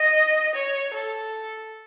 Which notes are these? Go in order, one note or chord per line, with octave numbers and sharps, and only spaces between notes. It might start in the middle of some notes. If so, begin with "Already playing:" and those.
Already playing: D#5
C#5
A4